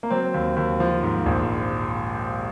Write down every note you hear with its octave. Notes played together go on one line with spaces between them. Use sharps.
A#3
F#3 C4
D#2
D#2
F3
G#2
A#1